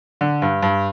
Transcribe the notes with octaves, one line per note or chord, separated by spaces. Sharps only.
D3
G2
G2